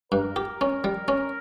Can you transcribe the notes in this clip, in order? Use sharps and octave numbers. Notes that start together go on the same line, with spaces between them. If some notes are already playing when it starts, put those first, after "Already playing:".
G2 A#4
G4
C#4
G3
C#4